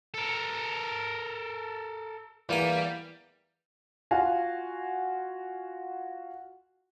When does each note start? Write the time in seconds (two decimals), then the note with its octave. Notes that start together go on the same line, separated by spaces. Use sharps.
0.14 A4 A#4
2.49 E2 G3 A#3 G#5
4.11 F4 F#4 F5 G#5